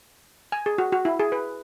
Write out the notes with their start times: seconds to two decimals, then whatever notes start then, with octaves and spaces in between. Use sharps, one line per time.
0.52 G#5
0.66 G#4
0.78 F#4
0.92 F#4
1.05 E4
1.19 G#4
1.32 B4